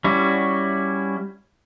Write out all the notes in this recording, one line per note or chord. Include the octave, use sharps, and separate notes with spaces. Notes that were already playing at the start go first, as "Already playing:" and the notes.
G3 C#4 E4 F#4